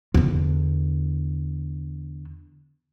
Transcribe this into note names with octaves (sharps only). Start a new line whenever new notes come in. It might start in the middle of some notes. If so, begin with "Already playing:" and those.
E2 D3